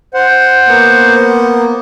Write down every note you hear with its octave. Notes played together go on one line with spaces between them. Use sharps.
C5 F#5
A#3 B3